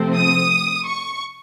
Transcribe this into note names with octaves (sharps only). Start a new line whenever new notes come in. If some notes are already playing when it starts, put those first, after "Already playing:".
Already playing: C3 F3 A3 C4
D#6
C#6